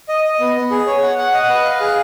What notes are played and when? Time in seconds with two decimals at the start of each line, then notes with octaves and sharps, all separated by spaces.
0.09 D#5
0.24 D#5
0.40 B3
0.56 B3
0.71 G#4
0.87 C#5
1.02 F#5
1.18 F#5
1.34 D#5
1.50 B4
1.65 F5
1.81 G#4